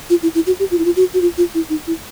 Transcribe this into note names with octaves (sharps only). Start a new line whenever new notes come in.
F4
E4
E4
F#4
G4
F4
E4
F4
F#4
F#4
F4
F4
E4
D#4
E4